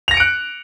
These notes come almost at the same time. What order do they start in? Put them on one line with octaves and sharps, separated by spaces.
F7 A#6 C#7 D7 F#6